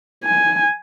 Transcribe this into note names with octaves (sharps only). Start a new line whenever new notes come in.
G#5